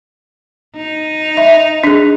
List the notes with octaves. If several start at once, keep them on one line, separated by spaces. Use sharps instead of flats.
D#4
E5
D4 G#4